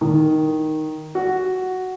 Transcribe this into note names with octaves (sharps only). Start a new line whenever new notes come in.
D#3
F#4